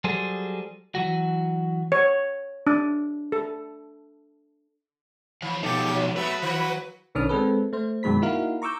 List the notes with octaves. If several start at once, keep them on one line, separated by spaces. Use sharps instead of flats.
F#3 G3 G#4 A4 C5
E3 F#3 F#4
C#5
D4
A4
D#3 F3 C#5 F5
B2 D#4 G4 A4
F#3 G#3
F#3 A3 B3 F#4 B4
D#3 F#4
B1 D#3 C#4 D4 D#6 F6
G#3 C4 A4 B4
A3 C5
F#2 B2 D#3 G#3 B5 B6
A#3 D#4 E4 F#4 A#4 F5
A#5 C#6 D6 E6 G6